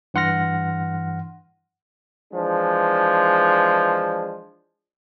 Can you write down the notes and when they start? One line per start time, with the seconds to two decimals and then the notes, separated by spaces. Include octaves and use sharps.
0.14 G2 E3 F#5 C6 F6 A#6
2.33 E3 F3 G#3 D4